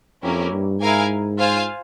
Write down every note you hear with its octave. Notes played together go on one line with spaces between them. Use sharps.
F2 A#3 C#4 E4 G4 A#4
G2
G#2 E4 A#4 F5 G#5
F4 C5 F5 G#5